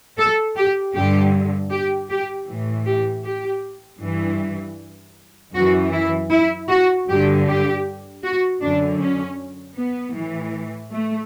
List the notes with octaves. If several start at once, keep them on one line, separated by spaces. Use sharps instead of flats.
A4
G4
G2 D3 G4
G4
G4
A2 E3
G4
G4
G2 E3
F#2 E3 F#4
E4
E4
F#4
G2 D3 G4
G4
F#4
F#2 D3 D4
C#4
B3
A2 E3
A3